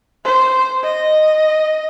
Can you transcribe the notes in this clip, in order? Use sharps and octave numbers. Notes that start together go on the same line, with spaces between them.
C5
D#5